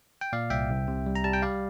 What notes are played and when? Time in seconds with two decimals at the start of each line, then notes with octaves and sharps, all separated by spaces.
0.21 G5
0.33 A#2 D5 F5
0.50 C2 E5 G5
0.70 C2
0.88 C3
1.06 G3
1.15 A#5
1.24 G3 A5
1.33 G5
1.42 G3 D5 F5